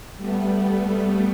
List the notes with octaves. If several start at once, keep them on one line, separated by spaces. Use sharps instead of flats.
G3 A3 B3